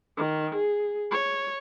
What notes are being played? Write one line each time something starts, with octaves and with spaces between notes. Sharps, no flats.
D#3
G#4
C#5